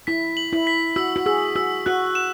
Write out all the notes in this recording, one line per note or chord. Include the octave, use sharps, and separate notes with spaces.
E4 B6
F#7
E4
B6
F#4 E6
F#4
G#4 E6
F#4 E6
F#4 F#6
E7